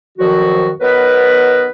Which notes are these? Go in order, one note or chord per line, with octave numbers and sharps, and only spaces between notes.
F2 A#2 D#3 F3 F#3 F#4
D#3 F#3 B3 A#4 B4